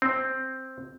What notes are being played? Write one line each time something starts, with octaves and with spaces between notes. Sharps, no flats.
C4